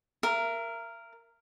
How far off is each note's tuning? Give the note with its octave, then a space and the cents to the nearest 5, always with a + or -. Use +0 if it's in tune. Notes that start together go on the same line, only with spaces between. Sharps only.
A#4 -5 E5 +40